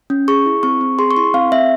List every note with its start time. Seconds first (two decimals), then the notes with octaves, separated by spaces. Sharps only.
0.10 C#4
0.28 G#4 C#6
0.46 E4
0.63 C4 C#6
0.81 C4
0.99 G#4 C6
1.11 C#6
1.17 E4 C6
1.34 C4 F5
1.52 C4 E5